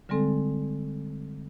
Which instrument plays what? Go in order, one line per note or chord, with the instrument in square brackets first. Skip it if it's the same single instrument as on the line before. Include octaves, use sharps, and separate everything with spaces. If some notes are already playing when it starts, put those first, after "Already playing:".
[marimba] D3 G3 G#3 C4 A4